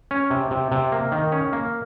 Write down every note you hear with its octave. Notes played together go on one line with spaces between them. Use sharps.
C#4
C3
C3
C3
A#3
D#3
C#4
A#3